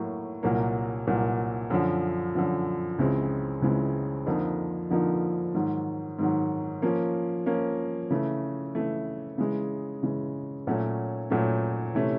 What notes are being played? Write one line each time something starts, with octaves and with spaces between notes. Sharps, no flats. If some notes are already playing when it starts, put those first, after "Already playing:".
Already playing: A2 F#3 A#3
C2 A#2 F#3 A#3
C2 A#2 F#3 A#3
F#2 D3 F3
F#2 D3 F3
C#2 C#3 E3 G#3 C4
C#2 C#3 E3 G#3 C4
F2 D3 F3 A#3 D#4
F2 D3 F3 A#3 D#4
G#2 D#3 F#3
G#2 D#3 F#3
F3 A#3 C#4
F3 A#3 C#4
C#3 E3 A3
C#3 E3 A3
C#3 E3 G#3
C#3 E3 G#3
A#2 F#3 A3 C#4 F#4
A#2 F#3 A3 C#4 F#4
C3 E3 A3 C#4